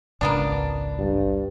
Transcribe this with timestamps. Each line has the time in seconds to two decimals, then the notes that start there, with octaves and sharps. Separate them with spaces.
0.21 G#1 C#2 A#3 B3 D4
0.99 G2